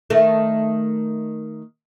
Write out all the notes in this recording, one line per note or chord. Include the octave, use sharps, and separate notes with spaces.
D#3 A3